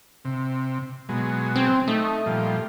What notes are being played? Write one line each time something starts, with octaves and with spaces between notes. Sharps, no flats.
C3
B2 F#3 G#3
C4
A3 D#4
A#2 F3 G3